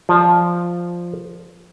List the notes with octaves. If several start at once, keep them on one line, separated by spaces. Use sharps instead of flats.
F3 D5